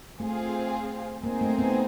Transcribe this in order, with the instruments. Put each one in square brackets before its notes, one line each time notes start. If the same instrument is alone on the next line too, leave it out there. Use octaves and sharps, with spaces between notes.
[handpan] A3 [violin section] C4 F4 G#4
[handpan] A#3 [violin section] C4 D#4 G#4 C5
[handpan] A3
B3